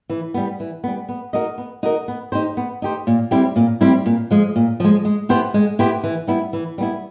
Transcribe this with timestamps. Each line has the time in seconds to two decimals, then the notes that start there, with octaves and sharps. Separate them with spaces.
0.10 E3
0.34 G3 B3
0.60 E3
0.84 G3 B3
1.09 B3
1.33 D#4 F#4 A#4 D#5
1.58 B3
1.83 D#4 F#4 A#4 D#5
2.08 B3
2.32 D#4 G4 C5
2.57 B3
2.82 D#4 G4 C5
3.07 A#2
3.31 G3 C4 E4 G4
3.56 A#2
3.81 G3 C4 E4 G4
4.06 A#2
4.31 F3 G#3
4.56 A#2
4.80 F3 G#3
5.05 G#3
5.29 B3 E4 G4 C5
5.54 G#3
5.79 B3 E4 G4 C5
6.04 E3
6.28 G3 B3 E4
6.53 E3
6.78 G3 B3 E4